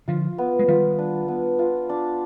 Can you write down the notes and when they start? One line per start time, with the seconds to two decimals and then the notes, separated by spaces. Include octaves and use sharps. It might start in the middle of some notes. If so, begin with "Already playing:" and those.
0.08 D3 F3 F4
0.38 B3
0.59 G#3
0.68 D#3 G3 F4
0.99 D4
1.28 B3
1.59 F4
1.89 D4